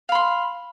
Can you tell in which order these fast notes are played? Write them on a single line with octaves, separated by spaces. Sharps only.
F5 B5 C6